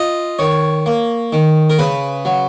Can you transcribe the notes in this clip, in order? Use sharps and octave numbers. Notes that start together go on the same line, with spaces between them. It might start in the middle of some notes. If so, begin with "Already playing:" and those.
Already playing: F4 D#5
D#3 C#5
A#3
D#3
A#4
C#3 B4
F#3